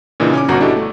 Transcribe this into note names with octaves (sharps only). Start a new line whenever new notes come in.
A#2 C#3 E3 D4 D#4
C#4 G#5 D6
G1 B2 F#4 A#5
D4 E4 F#4 G4 A4 D#5
A3